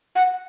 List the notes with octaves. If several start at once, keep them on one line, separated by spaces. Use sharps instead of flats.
F#5